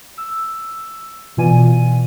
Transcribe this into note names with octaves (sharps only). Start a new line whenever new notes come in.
E6
B2 E3 F4 D5 G#5 D#7